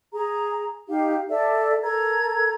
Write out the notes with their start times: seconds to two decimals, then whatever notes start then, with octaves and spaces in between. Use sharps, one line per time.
0.13 G#4 A#5
0.89 D#4 G4 F5
1.29 A4 D5 E5
1.83 A4 A#4 A#5 G#6